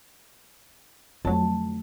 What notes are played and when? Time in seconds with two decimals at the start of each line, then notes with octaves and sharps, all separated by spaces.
1.25 F2 D3 F#3 A3 A5